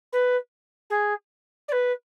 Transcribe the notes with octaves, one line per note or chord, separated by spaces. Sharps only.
B4
G#4
D5
B4